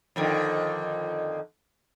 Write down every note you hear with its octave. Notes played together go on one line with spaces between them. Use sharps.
F2 D3 D#3